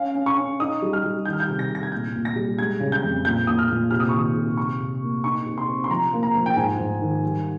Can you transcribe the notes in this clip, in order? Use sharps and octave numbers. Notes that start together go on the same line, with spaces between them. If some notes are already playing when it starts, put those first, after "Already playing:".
Already playing: C#4 F5
C#4
C#6
C#4
D#4 D#6
G3
F6
G3
D#3 G6
F6
G6
C3
A#6
C3
A#6
G#6
A#2 G6
A#2
A#6
G3
G#3 G#6
C#3
G6
F2
A#2 G6
A#2 D#6
F6
A#2
C3 F6
D#6
D#3 C#6
D#6
C3
C3 C#6
C3
A#3
D#4 C#6
C3
C6
C4
C6
F3 A#5
A#3
A#5
F3
G5
G#2 G#5
G#2
D#3
G3